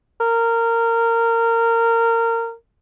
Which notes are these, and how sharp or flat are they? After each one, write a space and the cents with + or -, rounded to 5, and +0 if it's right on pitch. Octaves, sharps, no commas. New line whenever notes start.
A#4 -20